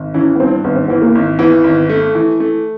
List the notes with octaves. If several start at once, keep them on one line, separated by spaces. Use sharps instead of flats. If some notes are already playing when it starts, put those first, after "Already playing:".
Already playing: G#1
E3 C#4
B3
G2 C4
G#1 B3
C4
E3 B3
A#3
G#1
E3 B3
G#1
A3
E3
A3